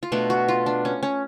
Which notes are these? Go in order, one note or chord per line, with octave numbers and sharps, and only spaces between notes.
F4
B2 A3 D4
F#4
F4
D4
C#4
C#4